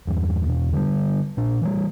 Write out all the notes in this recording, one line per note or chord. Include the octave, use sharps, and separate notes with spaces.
E2 G2
E2 B2
D3 F3 G3
A#2 D4
E3 G3